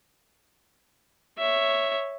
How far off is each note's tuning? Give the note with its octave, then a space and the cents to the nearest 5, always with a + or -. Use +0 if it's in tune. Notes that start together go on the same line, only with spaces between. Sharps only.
C#5 +0 E5 +0